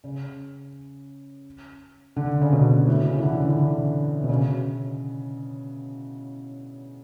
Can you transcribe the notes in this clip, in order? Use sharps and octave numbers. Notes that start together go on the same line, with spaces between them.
C#3
D3
C#3
B2
A2
C#3
E3
D3
E3
D3
B2
C#3